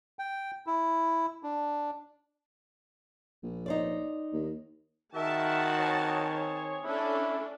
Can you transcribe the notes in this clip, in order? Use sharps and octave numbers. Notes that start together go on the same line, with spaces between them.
G5
E4
D4
A#1
D#4 C5 D5
D#2
D#3 F#4 G#4 A#4 E5 A5
C4 G#4 C#5
C#4 D4 E4 A4